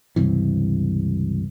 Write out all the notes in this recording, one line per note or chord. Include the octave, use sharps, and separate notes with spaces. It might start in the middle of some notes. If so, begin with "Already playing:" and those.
C#2 G2 C3 E3